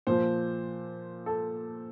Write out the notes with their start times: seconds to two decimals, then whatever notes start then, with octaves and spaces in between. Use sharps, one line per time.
0.07 A#2 F3 C5
1.26 A4